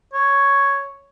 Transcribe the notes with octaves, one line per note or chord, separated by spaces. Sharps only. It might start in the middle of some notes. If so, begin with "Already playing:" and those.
C#5